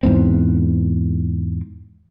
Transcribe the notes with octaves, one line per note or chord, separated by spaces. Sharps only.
E2 G#2 C4